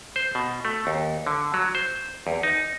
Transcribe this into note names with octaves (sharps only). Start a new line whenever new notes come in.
C5
B2
A3
D#2
D3
F#3
C5
E2
D#4